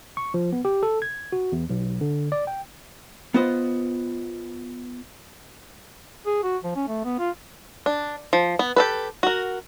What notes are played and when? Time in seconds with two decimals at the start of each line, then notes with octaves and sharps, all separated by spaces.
0.17 C#6
0.34 F3
0.53 B3
0.65 G4
0.83 A4
1.02 G#6
1.32 F#4
1.52 E2
1.70 B1
2.01 D3
2.32 D5
2.47 G5
3.34 B3 F4 B4 C5 D#5
6.26 G#4
6.43 F#4
6.64 F3
6.76 C#4
6.88 A3
7.04 B3
7.19 F4
7.86 D4
8.33 F3
8.59 B3
8.76 G4 A4 B4
9.23 F#4 A#4